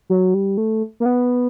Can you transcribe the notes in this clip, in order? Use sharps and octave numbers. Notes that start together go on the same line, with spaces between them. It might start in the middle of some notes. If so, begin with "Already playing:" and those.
F#3
G3
A3
A#3
B3